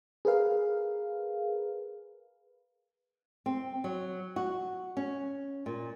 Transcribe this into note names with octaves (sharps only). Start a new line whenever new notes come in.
G#4 A#4 B4 F5
C4
F#3
F#4
C#4
A#2